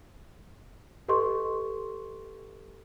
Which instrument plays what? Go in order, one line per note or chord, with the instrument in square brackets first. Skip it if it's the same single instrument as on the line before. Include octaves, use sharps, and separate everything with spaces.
[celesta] G4 A4 B4 D#5 C6 C#6